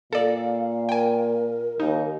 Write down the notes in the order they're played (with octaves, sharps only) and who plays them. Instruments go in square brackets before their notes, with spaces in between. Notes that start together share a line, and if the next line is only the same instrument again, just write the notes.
[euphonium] A#2 [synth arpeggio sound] A4 D5 [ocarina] F5
[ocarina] A#4 [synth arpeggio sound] G5 G#5
[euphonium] D#2 [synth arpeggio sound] D#4